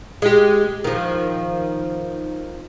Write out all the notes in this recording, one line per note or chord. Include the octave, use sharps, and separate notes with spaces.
G#3 G4
D#3 F3